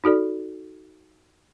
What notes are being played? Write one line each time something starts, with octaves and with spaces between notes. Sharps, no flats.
D#4 F#4 A4 D5